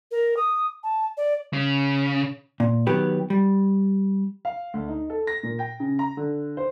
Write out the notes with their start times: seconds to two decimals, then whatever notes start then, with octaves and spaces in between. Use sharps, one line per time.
0.11 A#4
0.37 D#6
0.83 A5
1.17 D5
1.53 C#3
2.60 A#2
2.87 D#3 F#3 B3 G4 B4
3.30 G3
4.45 F5
4.74 D2
4.89 D#4
5.10 A4
5.27 A#6
5.43 A#2
5.59 G5
5.80 C#3
5.99 A#5
6.17 D3
6.57 C5